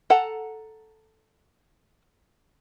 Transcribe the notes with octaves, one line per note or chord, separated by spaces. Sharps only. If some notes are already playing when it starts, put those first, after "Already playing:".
A4 F#5 A5 A#5